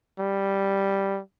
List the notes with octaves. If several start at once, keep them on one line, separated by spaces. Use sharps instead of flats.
G3